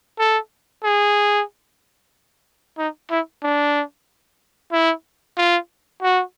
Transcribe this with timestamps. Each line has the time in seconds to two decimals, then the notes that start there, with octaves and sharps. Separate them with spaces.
0.19 A4
0.84 G#4
2.78 D#4
3.10 E4
3.43 D4
4.72 E4
5.37 F4
6.02 F#4